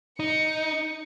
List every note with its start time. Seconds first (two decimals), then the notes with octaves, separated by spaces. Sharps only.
0.20 D#4 C#7